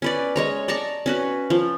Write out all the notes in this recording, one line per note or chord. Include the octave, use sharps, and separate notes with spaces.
C#4 B4 D5
G#3 C#5 A#5
D5 A5 A#5 C#6
C#4 F#4 B4
F3